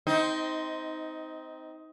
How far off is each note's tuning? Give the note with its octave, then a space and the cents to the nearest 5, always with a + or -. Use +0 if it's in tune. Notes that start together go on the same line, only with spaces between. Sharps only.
C4 -10 D#4 +15